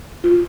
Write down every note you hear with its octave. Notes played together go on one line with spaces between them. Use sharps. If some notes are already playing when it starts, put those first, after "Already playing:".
F4